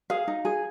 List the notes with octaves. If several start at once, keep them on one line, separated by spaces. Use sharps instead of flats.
G#4 F5
D#4
G#4